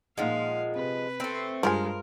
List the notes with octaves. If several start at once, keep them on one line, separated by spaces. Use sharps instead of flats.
A#2 F3 G#3 D#4 F5 F#5
C3 B4
A3 C4
G2 F3 G#3 F4 A#4 G#5